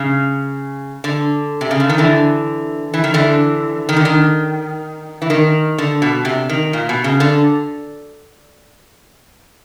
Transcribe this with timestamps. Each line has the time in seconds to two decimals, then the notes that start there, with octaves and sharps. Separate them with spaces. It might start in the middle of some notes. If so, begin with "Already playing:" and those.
Already playing: C#3
1.04 D3
1.61 C3
1.71 C#3
1.80 D3
1.90 D#3
1.98 D3 E3
2.94 E3
3.04 D#3
3.14 D3 E3
3.89 D#3
3.96 D3
4.05 D#3
5.22 E3
5.30 D#3
5.78 D3
6.02 B2
6.25 C3
6.49 D#3
6.73 A#2
6.89 B2
7.04 C#3
7.20 D3